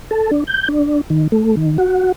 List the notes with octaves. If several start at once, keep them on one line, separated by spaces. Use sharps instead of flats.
A4
D4
G6
D4
D#3
A3
D#3
F#4